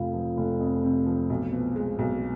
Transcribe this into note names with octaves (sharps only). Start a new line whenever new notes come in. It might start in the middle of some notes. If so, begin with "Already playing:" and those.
Already playing: F1 F2 C3 F4 F5
F3
F1
F2
C3
F3
B1
B2
G#3
B1